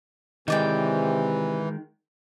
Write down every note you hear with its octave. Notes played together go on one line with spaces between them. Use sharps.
C3 D#3 E3 G#3 D#4 D5 G5